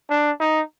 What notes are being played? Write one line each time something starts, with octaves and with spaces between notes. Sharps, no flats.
D4
D#4